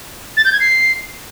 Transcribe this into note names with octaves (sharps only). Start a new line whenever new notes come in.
A6
G6
G#6
C7